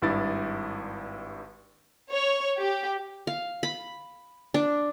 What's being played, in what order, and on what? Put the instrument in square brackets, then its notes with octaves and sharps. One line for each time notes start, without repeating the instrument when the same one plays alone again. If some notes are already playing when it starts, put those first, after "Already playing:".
[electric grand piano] G#1 G2 E4 A6
[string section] C#5
G4
[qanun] F5
B5
D4